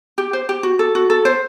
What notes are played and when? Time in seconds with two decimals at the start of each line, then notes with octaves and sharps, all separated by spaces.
0.18 G4
0.33 C5
0.49 G4
0.63 F#4
0.79 A4
0.95 F#4
1.10 A4
1.25 C5